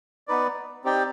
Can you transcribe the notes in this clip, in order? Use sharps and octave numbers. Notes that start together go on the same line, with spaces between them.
B3 D#4 B4 D5
C4 D#4 G4 D5 G5